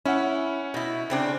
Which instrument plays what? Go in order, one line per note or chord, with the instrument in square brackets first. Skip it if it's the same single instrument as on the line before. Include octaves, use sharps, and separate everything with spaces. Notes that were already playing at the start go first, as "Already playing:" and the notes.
[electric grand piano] C#4 F#5 [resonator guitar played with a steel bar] E4
[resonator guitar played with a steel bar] B2 E4
C#3 C4 D4